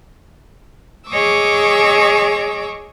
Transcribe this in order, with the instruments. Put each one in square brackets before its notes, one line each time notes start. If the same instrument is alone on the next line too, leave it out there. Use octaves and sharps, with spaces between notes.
[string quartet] G#4 C#5 D#5 C#6 D6 E6